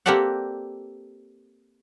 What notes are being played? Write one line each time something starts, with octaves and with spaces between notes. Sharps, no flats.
A#3 C4 G4 A4 D5 F#5